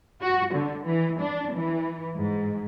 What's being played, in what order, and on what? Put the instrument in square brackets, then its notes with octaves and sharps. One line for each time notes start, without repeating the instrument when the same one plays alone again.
[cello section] F#4
D3
E3
D4
E3
G#2